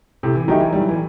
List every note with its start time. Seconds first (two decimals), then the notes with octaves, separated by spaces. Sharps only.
0.23 A2 C3
0.35 E3
0.48 D#3 F#3 A3 D#4 G4
0.60 E3
0.73 A2 G3
0.80 F#3
0.89 E3